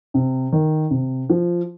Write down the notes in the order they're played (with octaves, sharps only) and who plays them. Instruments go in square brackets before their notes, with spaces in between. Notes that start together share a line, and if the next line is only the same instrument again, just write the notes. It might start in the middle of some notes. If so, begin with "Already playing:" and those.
[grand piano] C3
D#3
C3
F3